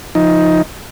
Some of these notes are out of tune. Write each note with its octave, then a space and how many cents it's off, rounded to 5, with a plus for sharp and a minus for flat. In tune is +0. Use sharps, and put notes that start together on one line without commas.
F3 +0 D#4 +10